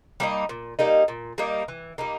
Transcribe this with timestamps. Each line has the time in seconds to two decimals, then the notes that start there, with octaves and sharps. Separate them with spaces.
0.20 G3 A#3 D#4
0.49 A#2
0.79 G3 A#3 D#4
1.08 A#2
1.38 G3 A#3 D#4
1.68 E3
1.98 G3 A#3 D#4